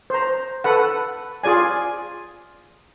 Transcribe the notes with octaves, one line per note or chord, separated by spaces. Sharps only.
C5 A#5
A4 B4 F#5
F4 G#4 D5 G#5